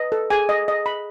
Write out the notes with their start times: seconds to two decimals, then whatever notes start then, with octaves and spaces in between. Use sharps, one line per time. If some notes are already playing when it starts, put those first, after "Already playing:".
Already playing: B4 D#5
0.12 A4
0.30 G#4 G#5
0.49 D#5
0.68 D#5
0.86 B5